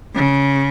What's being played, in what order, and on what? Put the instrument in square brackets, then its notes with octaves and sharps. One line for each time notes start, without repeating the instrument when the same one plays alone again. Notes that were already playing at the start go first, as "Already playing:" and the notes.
[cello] C#3